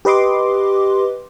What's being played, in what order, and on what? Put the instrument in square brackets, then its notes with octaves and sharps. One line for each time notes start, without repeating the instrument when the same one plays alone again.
[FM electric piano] G4 B4 D#5 C6 D6